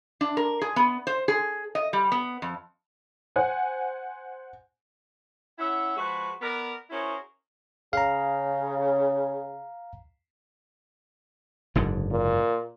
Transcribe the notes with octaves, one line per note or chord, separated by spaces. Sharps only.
D4
A#4
G#4
B3
C5
G#4
D#5
G3
B3
F2
C5 F#5 G#5
C#4 E4 E5 F#5
F3 G#3 F#4 B4
B3 A#4 D5
C#4 E4 F#4 G#4 A#4 C5
C#3 F5 A#5
F#1 G#2 D3
A#2